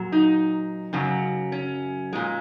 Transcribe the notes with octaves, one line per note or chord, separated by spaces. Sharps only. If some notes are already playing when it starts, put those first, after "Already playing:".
Already playing: A#2 F#3
D#4
F#2 C#3 F#3
C#4
A#2 G#3